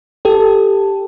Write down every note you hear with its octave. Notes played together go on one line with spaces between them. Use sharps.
G4 A4